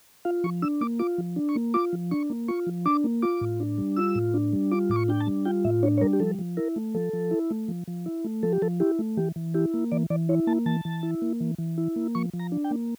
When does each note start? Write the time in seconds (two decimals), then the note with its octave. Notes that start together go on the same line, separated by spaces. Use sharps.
0.25 F4 F5
0.44 F3 C#6
0.62 D4 E6
0.81 A#3 D6
0.99 F4 D6
1.18 F3
1.36 D4
1.49 C#6
1.56 A#3
1.74 F4 D6
1.93 F3
2.11 D4 C#6
2.30 A#3
2.48 F4 C#6
2.67 F3
2.85 D4 D6
3.04 A#3
3.22 F4 D6
3.41 A2
3.60 D4
3.78 G3
3.97 F4 E6
4.15 A2
4.34 D4
4.53 G3
4.71 F4 D6
4.90 A2 D6
4.96 C#6
5.08 D4 G5
5.21 A5
5.27 G3
5.45 F4 G5
5.65 A2 E5
5.83 D4 C#5
5.98 C#5
6.01 G3 A#4
6.13 G4
6.20 F3 A4
6.39 F3
6.57 E4 A#4
6.76 A3
6.94 F3 A4
7.13 F3
7.31 E4
7.51 A3
7.68 F3
7.87 F3
8.06 E4
8.24 A3
8.43 F3 A4
8.53 G4
8.62 F3 A4
8.80 E4 G4
8.99 A3
9.17 E3 G4
9.36 E3
9.54 E4 G4
9.74 A#3
9.92 E3 D5
10.10 E3 D5
10.29 E4 C#5
10.47 A#3 A5
10.66 E3 A5
10.85 E3
11.03 E4
11.22 A#3
11.41 E3
11.58 E3
11.78 E4
11.96 A#3
12.15 F3 C#6
12.33 F3
12.39 A#5
12.52 D4
12.64 G5
12.71 A#3